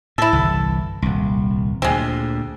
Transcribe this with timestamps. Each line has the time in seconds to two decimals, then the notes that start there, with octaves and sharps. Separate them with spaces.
0.18 A2 E4 A4
0.33 G1 C2 E3
1.02 D#1 C2
1.82 D2 A#2 G#3 C4